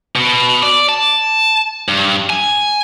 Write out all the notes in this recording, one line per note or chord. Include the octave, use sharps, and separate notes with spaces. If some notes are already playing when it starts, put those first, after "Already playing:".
B2
D5
A5
G2
G#5